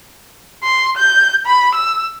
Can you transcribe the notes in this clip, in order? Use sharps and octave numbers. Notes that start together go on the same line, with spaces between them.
C6
G6
B5
E6